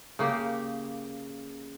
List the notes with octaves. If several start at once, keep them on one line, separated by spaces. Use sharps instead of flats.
C#3 A#3 G4